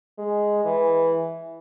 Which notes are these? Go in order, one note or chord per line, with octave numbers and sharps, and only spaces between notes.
G#3
E3